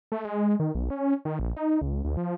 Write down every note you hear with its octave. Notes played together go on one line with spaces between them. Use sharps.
A3
G#3
G#3
D#3
B1
C#4
D#3
A#1
D#4
C#2
D2
F3